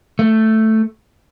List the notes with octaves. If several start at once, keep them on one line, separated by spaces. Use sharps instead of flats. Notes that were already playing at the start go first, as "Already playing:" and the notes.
A3